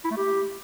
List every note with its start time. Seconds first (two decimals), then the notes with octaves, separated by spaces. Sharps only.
0.05 E4
0.11 A3
0.17 G4